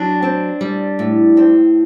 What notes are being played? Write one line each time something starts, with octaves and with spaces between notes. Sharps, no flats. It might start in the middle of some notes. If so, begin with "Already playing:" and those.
Already playing: F#3 D4
C4
G3
A2
C4